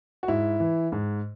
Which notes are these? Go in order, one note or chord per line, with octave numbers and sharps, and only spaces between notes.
F#4
G#2 E4
E3
G#2